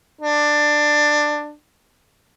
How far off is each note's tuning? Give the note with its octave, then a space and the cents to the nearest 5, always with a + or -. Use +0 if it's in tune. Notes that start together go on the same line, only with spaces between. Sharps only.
D4 +15